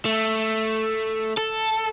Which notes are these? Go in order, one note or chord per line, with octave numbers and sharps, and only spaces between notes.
A3
A4